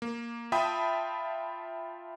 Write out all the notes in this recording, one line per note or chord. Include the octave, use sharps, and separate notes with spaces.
A#3
F4 E5 G5 A5 B5 D#6